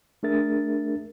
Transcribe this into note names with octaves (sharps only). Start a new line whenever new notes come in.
A3 D4 G#4 A#4 E5 A6